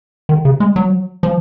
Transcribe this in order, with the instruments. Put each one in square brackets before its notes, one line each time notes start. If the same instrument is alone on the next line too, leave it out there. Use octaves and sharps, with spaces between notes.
[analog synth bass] D#3
C#3
G#3
F#3
F3